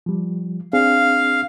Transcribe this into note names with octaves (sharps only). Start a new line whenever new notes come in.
F3 G3
C4 D4 G#4 F5